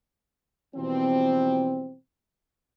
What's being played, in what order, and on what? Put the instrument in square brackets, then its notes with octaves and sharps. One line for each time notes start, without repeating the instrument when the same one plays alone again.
[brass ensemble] B2 E3 F3 G3 C4